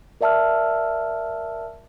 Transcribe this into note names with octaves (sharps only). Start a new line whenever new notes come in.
A#4 D5 E5 A5 E6 F6